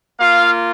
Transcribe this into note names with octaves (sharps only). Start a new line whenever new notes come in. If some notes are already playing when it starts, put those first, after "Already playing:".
A#3 F4 F5